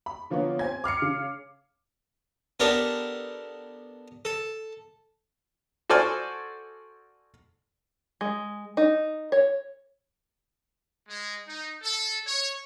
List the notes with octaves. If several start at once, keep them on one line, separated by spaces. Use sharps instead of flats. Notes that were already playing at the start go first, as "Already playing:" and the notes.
B5
D3 F3 A#3 B3 C#5
C4 G#5 G#6
D6 F6 C7 C#7
C#3
B3 D4 G4 A4 A#4
A4
F#4 A4 C5 D5 G#5 F6
G#3
D#4
C#5
G#3
D#4
A4
C#5